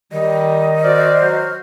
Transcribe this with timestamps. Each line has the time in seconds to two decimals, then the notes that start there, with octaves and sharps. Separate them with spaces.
0.12 D#3 G3 D#5
0.84 F#4 C5 D5 F6
1.22 F#3